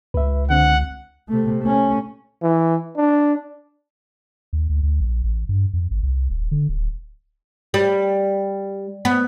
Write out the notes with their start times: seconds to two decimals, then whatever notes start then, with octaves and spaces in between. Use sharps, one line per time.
0.14 C#2 B4 E5
0.50 D3 C4 F#5
1.29 C3 A3
1.63 A3 C#4
2.43 E3
2.97 D4
4.53 D#2
4.69 D2
4.83 D2
5.00 A#1
5.24 A1
5.49 G2
5.73 F2
5.91 G#1
6.03 C2
6.30 D#1
6.51 D3
6.69 D1
7.74 G3
9.05 B3